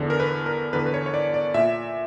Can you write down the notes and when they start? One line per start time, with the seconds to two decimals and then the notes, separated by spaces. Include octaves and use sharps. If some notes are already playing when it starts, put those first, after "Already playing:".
Already playing: E2 D3
0.10 A#4
0.20 B4
0.46 A#4
0.73 E2 D3 B4
0.86 B4
0.94 C#5
1.06 C#5
1.14 D5
1.34 D5
1.54 A#2 E5